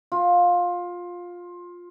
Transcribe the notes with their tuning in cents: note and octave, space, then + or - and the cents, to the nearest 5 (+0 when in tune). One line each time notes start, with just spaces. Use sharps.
F4 +15